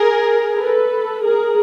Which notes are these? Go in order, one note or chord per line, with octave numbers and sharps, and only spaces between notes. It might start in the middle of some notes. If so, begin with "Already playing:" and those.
Already playing: G#4 A#4
A4 B4
G#4 A#4